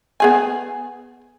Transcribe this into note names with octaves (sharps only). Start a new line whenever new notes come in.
B3 G#4 G#5